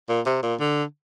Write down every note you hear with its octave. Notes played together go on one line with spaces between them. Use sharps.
A#2
C3
A#2
D3